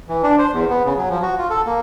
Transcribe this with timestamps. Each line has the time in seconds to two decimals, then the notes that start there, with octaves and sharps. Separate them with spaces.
0.09 E3
0.23 D4
0.39 C5
0.53 E2
0.70 B3
0.85 C#3
0.97 F#3
1.10 F3
1.22 F#4
1.38 F4
1.50 A4
1.66 A#3